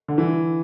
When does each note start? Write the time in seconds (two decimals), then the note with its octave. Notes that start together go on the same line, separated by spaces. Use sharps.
0.08 D3
0.18 E3